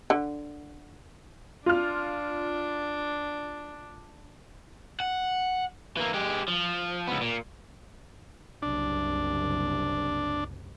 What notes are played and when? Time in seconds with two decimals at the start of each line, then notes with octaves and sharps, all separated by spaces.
0.10 D3
1.66 D4 F4 F6
5.00 F#5
5.97 E3 A#3
6.14 G#3 G4
6.48 F3
7.07 C#2 B3
7.21 A#2
8.62 F#1 C2 C3 D4